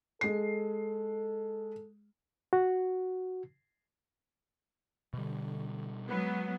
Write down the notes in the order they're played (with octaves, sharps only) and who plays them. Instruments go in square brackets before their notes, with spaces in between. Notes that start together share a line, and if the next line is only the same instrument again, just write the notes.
[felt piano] G#3 C7 [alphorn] A4
[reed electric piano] F#4
[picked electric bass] B2 G3 [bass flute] D3
[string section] F#3 B3 [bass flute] G#3